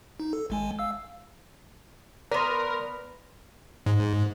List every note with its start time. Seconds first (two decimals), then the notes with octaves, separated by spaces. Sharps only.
0.20 D#4
0.33 A4
0.50 G#1 G#3 G#5
0.79 F5 E6
2.31 B3 A#4 B4 D5 C6
3.86 G#2